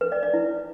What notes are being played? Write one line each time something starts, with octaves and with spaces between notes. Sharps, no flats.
B4
D5
D5
E4